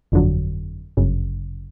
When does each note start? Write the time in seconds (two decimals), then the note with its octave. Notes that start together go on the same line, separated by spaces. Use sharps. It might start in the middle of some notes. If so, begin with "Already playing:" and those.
0.12 G1 F2 D3 F#3
0.97 G1 F#2 C#3